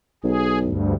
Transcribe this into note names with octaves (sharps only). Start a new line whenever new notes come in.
B1 G#4
D2 G2